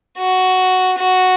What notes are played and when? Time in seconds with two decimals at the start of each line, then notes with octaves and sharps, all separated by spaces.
0.19 F#4
0.99 F#4